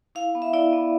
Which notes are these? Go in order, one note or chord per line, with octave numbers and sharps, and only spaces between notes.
E4 F5
B3
E5
E4 D5
B3